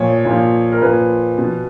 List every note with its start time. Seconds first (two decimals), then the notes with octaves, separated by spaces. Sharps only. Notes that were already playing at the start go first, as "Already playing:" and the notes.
Already playing: A#2 F3 C#5
0.25 A#2 F3
0.72 A#4
0.82 A#2 F3 B4
1.38 B2